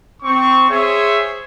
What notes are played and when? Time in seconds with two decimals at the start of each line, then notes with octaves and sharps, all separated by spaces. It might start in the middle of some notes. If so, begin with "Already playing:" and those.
0.23 C4 C#6
0.70 G#4 C5 C#5 E5